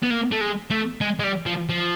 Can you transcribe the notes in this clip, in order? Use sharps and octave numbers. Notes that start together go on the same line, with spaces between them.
B3
A#3
A3
G#3
A3
G#3
G#3
G3
F3
F3